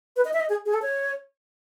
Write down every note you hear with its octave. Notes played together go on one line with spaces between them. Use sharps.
B4
D#5
E5
D#5
G#4
G#4
A4
C#5